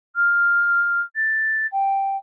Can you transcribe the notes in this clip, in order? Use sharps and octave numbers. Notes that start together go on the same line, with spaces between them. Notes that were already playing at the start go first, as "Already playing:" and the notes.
F6
A6
G5